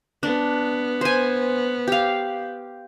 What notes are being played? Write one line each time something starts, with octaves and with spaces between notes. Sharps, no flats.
B3 D4
C5 G#5
G4 F5